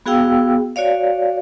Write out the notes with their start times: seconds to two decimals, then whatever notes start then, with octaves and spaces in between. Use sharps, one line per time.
0.06 B3 F#4 G#4 F5 G5 E6
0.76 F#4 C#5 D5 F5